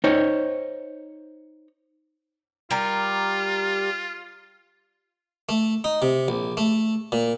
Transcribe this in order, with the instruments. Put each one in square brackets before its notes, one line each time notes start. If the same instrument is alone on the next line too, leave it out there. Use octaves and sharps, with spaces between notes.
[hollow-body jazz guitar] D#4 C5 C#5
[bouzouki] G3 A#4 [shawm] F4
[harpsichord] A3
D#4
C3
A#1
A3
A#2